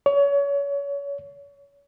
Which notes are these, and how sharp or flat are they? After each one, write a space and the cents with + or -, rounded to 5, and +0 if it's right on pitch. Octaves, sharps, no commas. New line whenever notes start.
C#5 +30